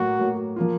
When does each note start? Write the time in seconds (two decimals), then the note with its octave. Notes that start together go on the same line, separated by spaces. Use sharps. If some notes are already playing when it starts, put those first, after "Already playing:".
Already playing: A2 F#3 A#3 F#4
0.19 A2 F#3 A#3
0.56 F3 A#3 F4